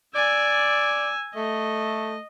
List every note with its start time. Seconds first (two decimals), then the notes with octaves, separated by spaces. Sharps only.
0.15 D5 G#5 E6
1.35 A3 D#5